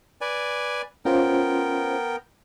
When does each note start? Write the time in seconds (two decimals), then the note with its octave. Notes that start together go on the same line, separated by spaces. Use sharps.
0.21 B4 D5 G#5
1.05 B3 C#4 F4 A#4 C5 G5